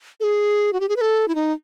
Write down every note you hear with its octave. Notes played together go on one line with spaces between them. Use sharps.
A4
G#4
F#4
G4
G#4
B4
A4
E4
D#4